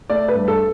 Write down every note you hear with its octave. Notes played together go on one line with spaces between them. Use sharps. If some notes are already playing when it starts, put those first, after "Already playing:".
A3 D5
B4
G2
A4